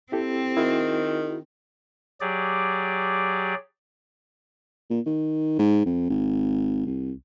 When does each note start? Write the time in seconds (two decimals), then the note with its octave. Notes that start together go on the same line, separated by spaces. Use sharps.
0.12 C4 E4 G4 A4
0.57 D#3 E4 F#4 G#4
2.21 F#3 G4 G#4 D5
4.90 A#2
5.06 D#3
5.59 G#2
5.86 F2
6.09 G#1
6.86 C2